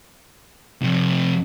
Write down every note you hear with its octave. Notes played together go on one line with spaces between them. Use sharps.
F2 C3